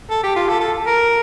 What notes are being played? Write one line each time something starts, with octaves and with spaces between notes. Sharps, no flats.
A4
G4
F4
A4
A4
A#4